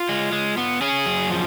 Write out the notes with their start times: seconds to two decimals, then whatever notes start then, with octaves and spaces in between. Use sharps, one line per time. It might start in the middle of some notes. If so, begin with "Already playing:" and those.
Already playing: F4
0.09 G#3
0.32 G#3
0.58 B3
0.81 C#4 G#4
1.06 F#2
1.31 F3